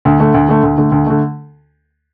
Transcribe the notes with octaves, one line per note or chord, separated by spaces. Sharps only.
D2
D3 A3
D2
D3 A3
D2
D3 A3
D2
D3 A3